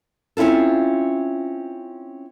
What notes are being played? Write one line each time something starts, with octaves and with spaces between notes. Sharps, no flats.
C4 C#4 E4 F4 A4